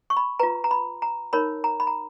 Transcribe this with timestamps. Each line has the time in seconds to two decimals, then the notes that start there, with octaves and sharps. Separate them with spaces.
0.10 C#6
0.17 B5
0.39 F4 B4 A#5
0.64 A#5
0.71 B5
1.02 A#5
1.33 D#4 A#4 C#5 B5
1.64 A#5
1.80 B5
1.87 A#5